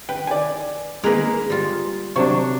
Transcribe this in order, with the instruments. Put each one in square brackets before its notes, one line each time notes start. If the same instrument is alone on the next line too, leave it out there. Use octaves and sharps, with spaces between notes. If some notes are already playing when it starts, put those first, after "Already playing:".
[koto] B4 [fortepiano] G5
[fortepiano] D5 G#5
[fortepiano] G#3 A#3 [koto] A#4 B4
[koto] G3 F4
[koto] C3 F#3 [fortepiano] D4 C#6